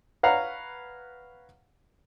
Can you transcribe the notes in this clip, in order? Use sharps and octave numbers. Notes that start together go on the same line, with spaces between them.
B4 C#5 F5 F#5 A#5